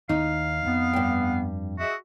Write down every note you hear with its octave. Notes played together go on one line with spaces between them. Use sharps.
D#2 D#3 D#4 F5
F2 B3
G2 G5
F#4 G#4 D#5 E5